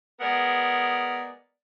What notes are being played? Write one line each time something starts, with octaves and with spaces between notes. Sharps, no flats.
G#3 B3 G#4 A#4 D5